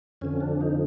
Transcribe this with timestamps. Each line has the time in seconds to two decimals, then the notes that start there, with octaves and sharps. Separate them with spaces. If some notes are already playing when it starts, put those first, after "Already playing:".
0.21 F2 D3 F3 C#4
0.41 D4
0.61 D#4